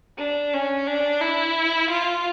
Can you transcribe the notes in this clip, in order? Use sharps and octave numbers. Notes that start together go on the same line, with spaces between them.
D4
C#4
D4
E4
F4